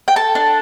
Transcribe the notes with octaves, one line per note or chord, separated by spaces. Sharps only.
G5
A4 A5
D4